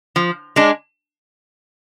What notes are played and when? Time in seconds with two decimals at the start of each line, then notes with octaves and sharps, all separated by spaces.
0.16 F3
0.56 G#3 D4